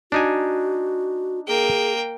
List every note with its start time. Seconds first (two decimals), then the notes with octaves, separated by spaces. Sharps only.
0.12 D4 D#4 F#4 G#5
1.47 A#3 G#4 G5